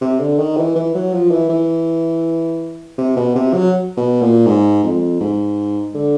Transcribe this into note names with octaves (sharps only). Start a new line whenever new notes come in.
C3
D3
D#3
E3
E3
F#3
F3
E3
E3
C3
B2
C3
F#3
B2
A#2
G#2
F2
G#2
D3